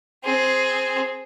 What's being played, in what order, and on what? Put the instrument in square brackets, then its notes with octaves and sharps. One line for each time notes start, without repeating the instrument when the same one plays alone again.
[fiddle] C4 G#4